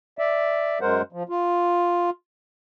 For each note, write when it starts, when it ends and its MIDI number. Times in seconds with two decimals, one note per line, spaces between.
0.19 0.79 74
0.19 0.79 76
0.81 1.02 42
0.81 1.02 56
0.81 1.02 70
0.81 1.02 72
0.81 1.02 78
1.12 1.23 53
1.29 2.10 65